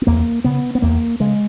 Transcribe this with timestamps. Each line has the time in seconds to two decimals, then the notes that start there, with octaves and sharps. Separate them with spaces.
0.02 B3
0.07 E2 A#3
0.44 C#3 B3
0.75 B3
0.82 E2 A#3
1.20 C#3 G#3